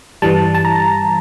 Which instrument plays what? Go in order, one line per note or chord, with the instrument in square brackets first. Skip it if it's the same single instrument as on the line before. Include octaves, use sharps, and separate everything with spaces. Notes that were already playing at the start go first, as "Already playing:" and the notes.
[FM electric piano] G2 E3 G3 A5
A5
A#5